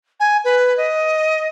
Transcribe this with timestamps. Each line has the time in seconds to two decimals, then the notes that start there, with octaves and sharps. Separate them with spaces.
0.20 G#5
0.44 B4
0.77 D#5